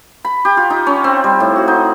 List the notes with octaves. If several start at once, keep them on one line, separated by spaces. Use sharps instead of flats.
B5
G4
F4
D#4
C#4
C4
G3
A2
F#4
D#4